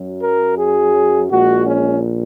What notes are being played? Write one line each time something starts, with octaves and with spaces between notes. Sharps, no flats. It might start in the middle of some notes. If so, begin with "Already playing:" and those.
Already playing: F#2 F#3
A#4
G#4
A#1 A#2 G#3 F#4
C#4